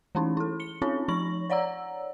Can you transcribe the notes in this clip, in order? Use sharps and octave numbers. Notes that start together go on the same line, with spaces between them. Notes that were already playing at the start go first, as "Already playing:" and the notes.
E3 A3 C#4 D#4 E4
E4 A4
C#7 G7
C4 C#4 D#4 F4 C#5
F3 D#4 C#6 A#6 F#7
C#5 D5 F#5 A#5 E6